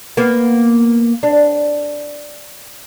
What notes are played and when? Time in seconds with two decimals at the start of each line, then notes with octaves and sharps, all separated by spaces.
0.17 A#3 B3
1.23 D4